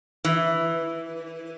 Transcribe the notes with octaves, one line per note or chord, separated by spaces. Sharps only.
E3